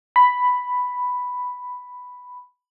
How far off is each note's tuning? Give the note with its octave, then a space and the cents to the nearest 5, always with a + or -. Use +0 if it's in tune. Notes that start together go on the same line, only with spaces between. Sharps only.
B5 +5